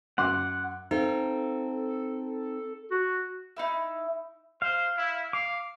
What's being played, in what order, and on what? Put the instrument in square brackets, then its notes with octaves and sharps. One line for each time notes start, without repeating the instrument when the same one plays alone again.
[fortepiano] F#2 C6 D6 [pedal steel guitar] F#5
[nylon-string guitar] C4 F5 [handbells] D#4 [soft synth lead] A4
[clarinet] F#4
[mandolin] D#4 E4 E5
[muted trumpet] C5 [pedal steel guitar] F5
[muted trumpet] E4
[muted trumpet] F5 [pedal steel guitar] D6